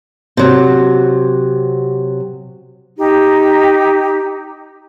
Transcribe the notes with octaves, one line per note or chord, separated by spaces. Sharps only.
C3 F#3
D#4 G4